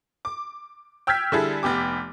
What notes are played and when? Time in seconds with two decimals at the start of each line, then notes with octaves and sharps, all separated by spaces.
0.25 D6
1.07 G5 E6 F6 G6 G#6 B6
1.32 D3 G3 E4 G#4 A4
1.63 F1 B3 G4 D6